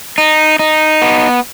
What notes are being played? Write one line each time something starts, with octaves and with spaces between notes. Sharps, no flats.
D#4
D#4
B3